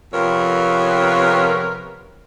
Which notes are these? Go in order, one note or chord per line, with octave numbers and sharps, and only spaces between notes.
F2 C3 F3 B3 A#4 C#5